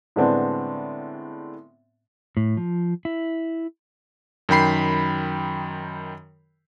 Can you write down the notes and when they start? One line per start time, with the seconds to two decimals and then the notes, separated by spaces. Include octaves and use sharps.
0.16 A2 D3 G#3 B3 C4 D4
2.37 A2
2.57 F3
3.05 E4
4.49 F#2 D#3 G5 B5 C7